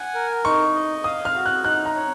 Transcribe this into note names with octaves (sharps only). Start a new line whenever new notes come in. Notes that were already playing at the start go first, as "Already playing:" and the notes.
Already playing: F#5 G#5
A#4
D#4 C#6
D#5
F5 D#6
F6
F#4
F#6
D#4 F#6
A#5
C#5